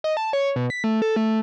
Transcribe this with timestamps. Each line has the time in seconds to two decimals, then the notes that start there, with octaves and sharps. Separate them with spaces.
0.04 D#5
0.17 A5
0.33 C#5
0.56 B2
0.70 B6
0.84 A3
1.02 A4
1.16 A3